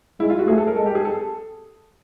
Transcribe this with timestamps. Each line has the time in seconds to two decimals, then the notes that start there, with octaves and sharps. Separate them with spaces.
0.20 G#3 E4
0.30 F4
0.39 F#4
0.48 A3 G#4
0.58 A4
0.67 A#4
0.76 G#3 A4
0.86 G4
0.95 G#4
1.05 A4